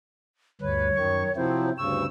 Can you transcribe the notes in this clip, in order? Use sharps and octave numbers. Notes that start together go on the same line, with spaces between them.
D2 G2 B4 C#5
F#2 D#3 C#6
C3 F3 F#3 C4 E4 C5
D2 G2 C#3 C#6 E6